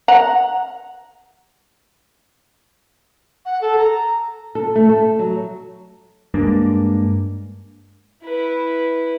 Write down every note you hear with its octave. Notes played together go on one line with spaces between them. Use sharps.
F#5 A#5
F#5
A4
A#5
A4
A3
A4
F#3
G2 G#3 A#3 D4
E4 B4